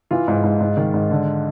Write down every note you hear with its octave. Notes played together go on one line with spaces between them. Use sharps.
E3 F4
G#2
G#2
G#2
D#3
G#2
D3